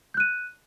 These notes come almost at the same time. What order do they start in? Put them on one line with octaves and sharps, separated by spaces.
G6 F#6 D#7